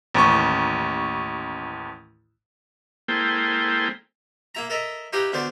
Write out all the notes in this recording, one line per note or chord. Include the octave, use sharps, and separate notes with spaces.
A1 D#2 C#6
G#3 A#3 E4 A4 C5 G5
A#3 E4 A#5
A4 A#4 D#5 E5
D#4 E4 G4 B4 D#5 F5
D2 D3 B3 C5 D5